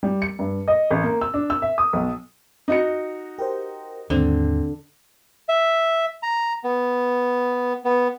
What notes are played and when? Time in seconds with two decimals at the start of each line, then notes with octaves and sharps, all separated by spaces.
0.03 G3
0.22 C#7
0.39 G2
0.68 D#5
0.91 A1
1.03 A#3
1.21 E6
1.34 D4
1.50 E6
1.62 E5
1.78 D#6
1.93 B1
2.68 D#4 F#4 C#7
3.39 G4 A#4 C5
4.10 D#2 G#2 D3 C4
5.49 E5
6.23 A#5
6.64 B3
7.85 B3